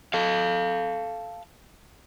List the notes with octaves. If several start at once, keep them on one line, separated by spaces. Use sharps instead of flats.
A4 F5